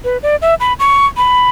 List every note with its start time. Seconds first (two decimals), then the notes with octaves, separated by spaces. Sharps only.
0.04 B4
0.23 D5
0.42 E5
0.60 B5
0.79 C#6
1.17 B5